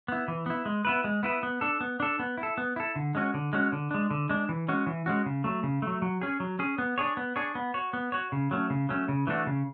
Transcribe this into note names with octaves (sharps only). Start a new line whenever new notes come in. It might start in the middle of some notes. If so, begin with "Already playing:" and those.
B3 E4
E3
B3 E4
G#3
B3 E4 B4
G#3
B3 E4 B4
B3
D4 A4
B3
D4 A4
B3
E4
A4
B3
E4 A4
D3
G#3 C#4 F#4
D3
G#3 C#4 F#4
D3
G#3 D4
D3
G#3 D4
E3
G#3 C#4 F#4
E3
G#3 C#4 F#4
C#3
F#3 A3
C#3
F#3 A3
F#3
C#4 G#4
F#3
C#4 G#4
B3
D4 G#4 C#5
B3
D4 G#4 C#5
B3
F#4 C#5
B3
F#4 C#5
C#3
F#3 A3 C#4
C#3
F#3 A3 C#4
C#3
E3 A3 D4 F#4
C#3